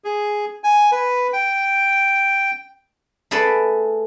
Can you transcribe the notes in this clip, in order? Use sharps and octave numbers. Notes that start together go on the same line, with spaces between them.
G#4
G#5
B4
G5
A3 G#4 A4 B4 D5